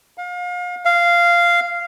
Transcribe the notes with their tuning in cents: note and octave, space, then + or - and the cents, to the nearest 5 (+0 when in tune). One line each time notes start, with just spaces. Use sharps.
F5 +35
F5 -10